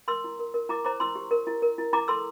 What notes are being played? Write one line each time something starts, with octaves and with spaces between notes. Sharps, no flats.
A#4 C6 E6
E4
A#4
A#4
E4 A#5 D6
C5 A#5 D6
E4 C6 E6
G4
A#4
E4
A#4
E4
E4 A#5 D6
A4 C6 E6